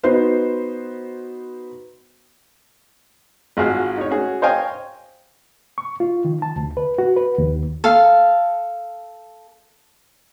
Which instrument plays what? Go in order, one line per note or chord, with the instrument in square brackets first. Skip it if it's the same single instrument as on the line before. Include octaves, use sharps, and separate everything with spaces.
[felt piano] B3 D#4 F#4 B4 C5
[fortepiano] G#1 F4 F#4 G#4 F5
D#4 C#5
C#4 F#4 G#4
C5 C#5 D#5 F5 G5 G#5
[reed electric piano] C#6
F4
D#3
A5
D2
B4
F#4
B4
D#2
[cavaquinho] A4 F5